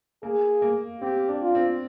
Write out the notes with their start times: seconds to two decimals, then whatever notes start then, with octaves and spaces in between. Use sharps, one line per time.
0.23 A#3 G#4
0.62 A#3
1.01 C4 G4
1.28 D4
1.42 F4
1.55 C4